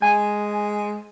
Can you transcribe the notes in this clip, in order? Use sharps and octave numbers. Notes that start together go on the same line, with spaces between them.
G#3 G#5